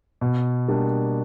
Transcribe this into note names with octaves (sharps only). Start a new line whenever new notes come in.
B2
G3 A#3 D4